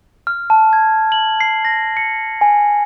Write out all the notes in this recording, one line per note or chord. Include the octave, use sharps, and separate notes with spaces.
F6
A5
G#6
F#7
C7
A#6
C#7
G#5